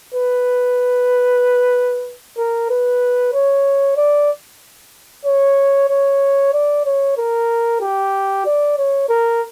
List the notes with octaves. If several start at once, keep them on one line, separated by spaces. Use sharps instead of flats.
B4
A#4
B4
C#5
D5
C#5
C#5
D5
C#5
A#4
G4
D5
C#5
A#4